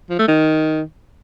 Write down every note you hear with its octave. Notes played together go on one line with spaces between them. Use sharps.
F3
A3
D#3